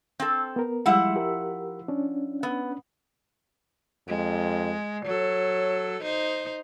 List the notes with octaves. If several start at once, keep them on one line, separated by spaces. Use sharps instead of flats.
C4 A4
B3 A#4
F3 G3 G#3 E4 F#5
G4 A#4
C#4 D4
B3
F2 G#3
F#3 A4 C#5
D#4 C5